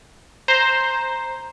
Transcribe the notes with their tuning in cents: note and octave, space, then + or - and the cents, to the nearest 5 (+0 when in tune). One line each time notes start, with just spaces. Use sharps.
C5 +0 A#5 +0